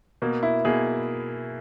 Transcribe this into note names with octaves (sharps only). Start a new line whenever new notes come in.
B2 A#3
E4
B2 A#3 G#4